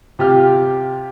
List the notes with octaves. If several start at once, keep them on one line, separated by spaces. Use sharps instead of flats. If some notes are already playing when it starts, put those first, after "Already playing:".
C3 F4 G4 G5 F6